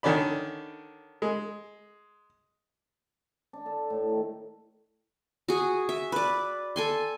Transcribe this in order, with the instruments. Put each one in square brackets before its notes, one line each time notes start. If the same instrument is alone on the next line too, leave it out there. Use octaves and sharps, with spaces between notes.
[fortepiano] D3 D#3 C#4 D5 B5
G#3
[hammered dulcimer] D4
A4
A2
D#3
[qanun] F#4 G#4
E5
B4 D5
A4 G#5 C6